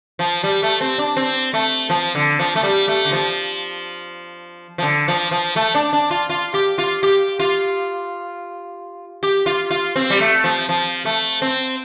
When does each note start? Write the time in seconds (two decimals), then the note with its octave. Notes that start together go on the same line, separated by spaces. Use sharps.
0.19 F3
0.44 G3
0.63 A3
0.81 C4
0.98 D4
1.17 C4
1.53 A3
1.90 F3
2.15 D3
2.39 F3
2.56 A3
2.63 G3
2.88 A3
3.05 D3
3.12 F3
4.78 F3
4.82 D3
5.08 F3
5.31 F3
5.56 A3
5.75 D4
5.93 D4
6.11 F4
6.30 F4
6.54 G4
6.78 F4
7.03 G4
7.39 F4
9.23 G4
9.46 F4
9.71 F4
9.96 C4
10.10 G3
10.20 A3
10.44 F3
10.69 F3
11.05 A3
11.42 C4